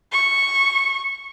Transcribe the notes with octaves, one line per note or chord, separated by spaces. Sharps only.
C#6